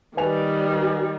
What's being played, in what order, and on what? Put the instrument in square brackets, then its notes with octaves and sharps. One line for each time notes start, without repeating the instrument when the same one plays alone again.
[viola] D#3 G3 [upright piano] B4 G#5 F7